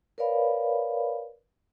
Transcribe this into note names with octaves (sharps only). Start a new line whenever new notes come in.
A#4 B4 C#5 D5 F5 B5